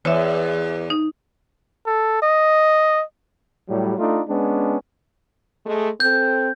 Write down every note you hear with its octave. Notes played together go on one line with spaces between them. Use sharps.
E2 C#5 E5
D#4
A4
D#5
A2 F#3 G3
A3 D4 D#4 F4
G#3 B3 C#4 D4
G#3 A3
C4 A4 G6